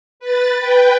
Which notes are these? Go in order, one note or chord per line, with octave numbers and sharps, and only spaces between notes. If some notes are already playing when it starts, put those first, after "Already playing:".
B4 A6
B4 G5